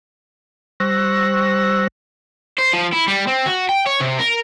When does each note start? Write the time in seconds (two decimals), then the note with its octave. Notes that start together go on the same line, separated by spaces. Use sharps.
0.80 G3 C5 C#6 E6 F#6 A#6
2.58 C5
2.73 F3
2.93 E4
3.08 G3
3.27 C4
3.46 F#4
3.69 G5
3.87 C#5
4.01 C3
4.19 A#4